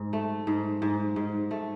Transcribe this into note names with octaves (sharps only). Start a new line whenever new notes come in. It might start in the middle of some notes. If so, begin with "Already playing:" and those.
Already playing: G#2
A3
G#2
G#2
G#2
A3